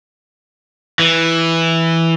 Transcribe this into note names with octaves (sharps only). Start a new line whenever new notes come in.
E3